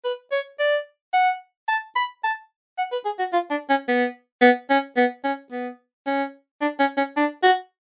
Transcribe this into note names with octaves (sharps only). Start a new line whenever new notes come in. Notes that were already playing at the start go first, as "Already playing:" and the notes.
B4
C#5
D5
F#5
A5
B5
A5
F#5
B4
G#4
F#4
F4
D4
C#4
B3
B3
C#4
B3
C#4
B3
C#4
D4
C#4
C#4
D4
F#4